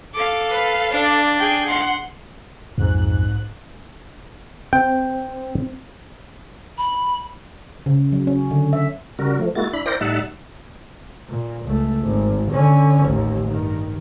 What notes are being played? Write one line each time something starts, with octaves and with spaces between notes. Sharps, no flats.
A4 F5 D6
B4
D4 D5
G#4 G5
F#5 C6
B1 F2 G#2 F#6
C4 G5
B5
C#3
F#3
C#4
D3
E5
C#3 G3 F#4 A#4
F3 A3
G#3 A#3 E4 F#4 A6
D4 E4 B5
E4 A#4 C5 D5 G5 A#6
A2 G3 D#4 E5 F#5 A5
A#2
C#2 A3
G#1
D3 C#4
A1 D#2
G2 D#3